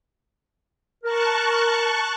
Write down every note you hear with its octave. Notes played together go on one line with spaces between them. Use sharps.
A#4 A5 C#6 F#6